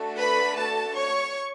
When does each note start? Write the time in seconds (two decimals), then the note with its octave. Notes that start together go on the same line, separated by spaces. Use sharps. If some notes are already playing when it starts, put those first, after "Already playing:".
Already playing: A3 D4 F#4 A4
0.18 B4 B5
0.57 A4 A5
0.96 C#5 C#6